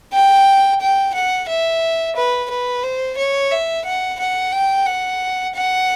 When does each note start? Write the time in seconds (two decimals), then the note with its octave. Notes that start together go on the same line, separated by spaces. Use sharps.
0.13 G5
0.81 G5
1.14 F#5
1.48 E5
2.16 B4
2.50 B4
2.83 C5
3.18 C#5
3.51 E5
3.85 F#5
4.19 F#5
4.52 G5
4.86 F#5
5.55 F#5